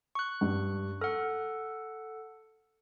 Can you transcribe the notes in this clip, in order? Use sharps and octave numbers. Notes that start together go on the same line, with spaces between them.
C#6 F#6
G2
A4 F#5 F6